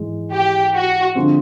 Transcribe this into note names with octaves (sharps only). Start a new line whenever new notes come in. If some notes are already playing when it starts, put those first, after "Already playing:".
Already playing: G#2 E3 G#3
G4
F#4
D3 F3 G#3 C4